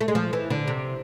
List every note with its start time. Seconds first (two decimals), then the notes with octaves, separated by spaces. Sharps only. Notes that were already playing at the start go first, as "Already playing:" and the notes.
0.01 A3
0.08 G#3
0.15 F3
0.33 E3
0.50 D3
0.68 C3